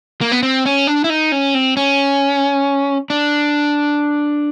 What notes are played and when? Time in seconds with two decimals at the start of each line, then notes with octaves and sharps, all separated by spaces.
0.21 A#3
0.32 B3
0.43 C4
0.66 C#4
0.87 D4
1.04 E4
1.10 D#4
1.32 C#4
1.55 C4
1.77 C#4
3.10 D4